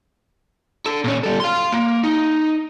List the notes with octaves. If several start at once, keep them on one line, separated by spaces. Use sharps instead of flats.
D3 A4
A#2 C#4
G3 A4
F5 C6
A#3
D#4